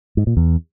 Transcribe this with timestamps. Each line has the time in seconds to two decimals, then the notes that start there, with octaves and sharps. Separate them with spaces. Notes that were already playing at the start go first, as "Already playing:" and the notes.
0.17 G#2
0.27 A#2
0.37 E2